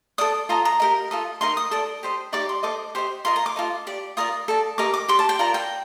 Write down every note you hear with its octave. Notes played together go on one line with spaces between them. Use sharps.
A4 D5 D#6
F4 A4 D#5 A#5
A#5
G4 A#4 D#5
F4 A4 D#5
D#4 A#4 D#5 C6
D#6
A4 D5 D#6
G4 C5 D#5
D#4 G4 D5 D6
C6
A4 C5 D#5 D6
G4 C5 D#5
F4 A#4 D#5 C6
A#5
D6
F4 A4 D#5
G4 D5
F4 A#4 D5 D#6
A4 D5
G4 A#4 D#5 D6
D6
G4 D5 C6
A5
G5
F4 A#4 D5 A#5
G5